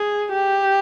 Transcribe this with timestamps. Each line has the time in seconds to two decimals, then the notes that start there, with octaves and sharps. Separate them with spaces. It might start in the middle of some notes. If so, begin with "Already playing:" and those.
Already playing: G#4
0.32 G4